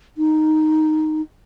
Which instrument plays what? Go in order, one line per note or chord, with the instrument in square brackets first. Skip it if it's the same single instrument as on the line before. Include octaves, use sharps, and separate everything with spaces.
[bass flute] D#4